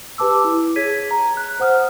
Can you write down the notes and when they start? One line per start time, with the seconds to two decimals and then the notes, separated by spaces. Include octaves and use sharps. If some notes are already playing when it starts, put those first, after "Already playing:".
0.18 G4 B4 A5 D6 E6
0.44 E4
0.76 G#4 C#5 G#6 B6 D#7
1.11 A#5
1.37 F#6
1.60 C5 F#5 D#6 F6